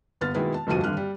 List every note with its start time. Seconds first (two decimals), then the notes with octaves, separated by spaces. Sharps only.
0.21 G1 B3 F6 A6
0.34 B2 D#3 G#3 B3 E4 B4
0.54 A5
0.67 F1 D2 G2 F3 F#4 D#7
0.84 G#1 G2 D3 F6 F#6
0.97 G3